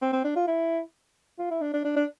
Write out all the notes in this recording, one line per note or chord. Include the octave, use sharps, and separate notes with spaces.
C4
C4
D4
F4
E4
F4
E4
D4
D4
D4
D4